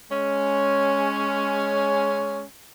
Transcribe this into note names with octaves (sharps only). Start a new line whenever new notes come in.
G#3 C#4